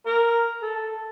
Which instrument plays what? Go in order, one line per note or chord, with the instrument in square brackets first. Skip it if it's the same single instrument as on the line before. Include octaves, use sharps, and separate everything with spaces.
[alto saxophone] A#4
A4